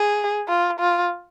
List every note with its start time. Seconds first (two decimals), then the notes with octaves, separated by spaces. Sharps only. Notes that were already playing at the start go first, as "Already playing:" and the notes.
Already playing: G#4
0.48 F4
0.80 F4